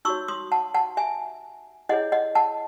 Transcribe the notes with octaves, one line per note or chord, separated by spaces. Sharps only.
D#4 F#4 C#5 C#6 E6
C6 D#6
F#5 A5
F#5 A5
E5 G#5
E4 G#4 C#5 D#5 F#5
D#5 F#5
F#5 A5